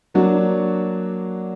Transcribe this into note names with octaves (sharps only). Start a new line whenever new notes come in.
F#3 A#3 D4 F#4